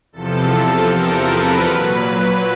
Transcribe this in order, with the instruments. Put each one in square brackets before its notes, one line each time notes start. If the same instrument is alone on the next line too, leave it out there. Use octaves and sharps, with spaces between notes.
[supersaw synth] E2 C3 F3 A4
A#4
B4
A#2 F#3 B4